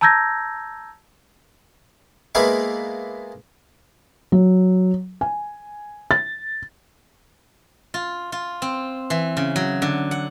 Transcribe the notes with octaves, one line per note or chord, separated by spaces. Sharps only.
A5 A#5 E6 G6 G#6 A#6
G#3 A#3 B3 E4 B4 F5
F#3
G#5
A6
F4
F4
C4
E3
C#3
F#3
D3
F#5